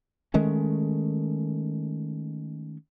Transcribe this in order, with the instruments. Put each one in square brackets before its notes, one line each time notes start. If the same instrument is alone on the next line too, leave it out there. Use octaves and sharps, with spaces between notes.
[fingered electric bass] D#3 G#3 A3 C#4